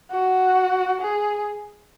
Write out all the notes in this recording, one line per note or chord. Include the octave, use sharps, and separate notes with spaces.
F#4
G#4